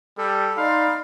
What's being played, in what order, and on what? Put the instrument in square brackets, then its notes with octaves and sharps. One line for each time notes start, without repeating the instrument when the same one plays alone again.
[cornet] G3 [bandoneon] A4
[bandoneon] D#4 [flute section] D5 B5 C6 [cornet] F5